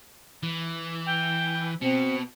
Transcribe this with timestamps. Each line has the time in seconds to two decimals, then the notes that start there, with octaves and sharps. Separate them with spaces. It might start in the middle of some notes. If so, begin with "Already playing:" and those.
0.43 E3
1.06 G5
1.82 B2 C4 C#7